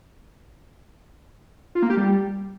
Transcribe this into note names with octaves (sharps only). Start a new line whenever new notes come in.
F4
A#3
G4
G3